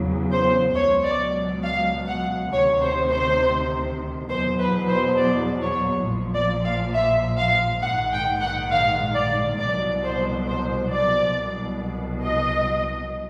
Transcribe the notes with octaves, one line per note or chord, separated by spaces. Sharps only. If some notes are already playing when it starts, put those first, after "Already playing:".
Already playing: E2 C#3 F#3
C5
C#2 B2 F#3 C#5
D5
F5
F#5
D2 C3 D#3 C#5
C5
C5
E2 B2 F#3 C5
B4
C5
D5
C#5
A#1 A#2 F3
D5
F5
E5
F5
A#1 G#2 D#3 F#5
G5
F#5
F5
D5
C2 B2 F#3 D5
C5
C5
D5
C2 B2 F#3
D#5